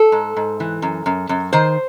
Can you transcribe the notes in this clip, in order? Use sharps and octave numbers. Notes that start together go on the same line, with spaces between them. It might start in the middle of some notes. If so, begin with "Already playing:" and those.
Already playing: A4
G#2
G#2
E3
F#2
F#2
F#2
D#3 C5